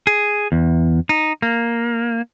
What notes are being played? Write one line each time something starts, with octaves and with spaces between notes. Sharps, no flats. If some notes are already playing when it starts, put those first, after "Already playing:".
G#4
E2
D#4
A#3